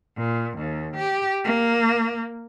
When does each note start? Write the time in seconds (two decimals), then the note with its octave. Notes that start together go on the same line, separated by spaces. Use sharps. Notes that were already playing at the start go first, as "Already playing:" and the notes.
0.17 A#2
0.58 D#2
0.96 G4
1.44 A#3